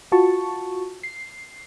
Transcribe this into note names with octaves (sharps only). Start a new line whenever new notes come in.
F4 F#4 A5 C#6
C7